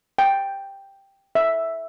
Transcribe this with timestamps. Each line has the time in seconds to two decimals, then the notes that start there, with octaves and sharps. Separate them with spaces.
0.18 G5
1.35 E5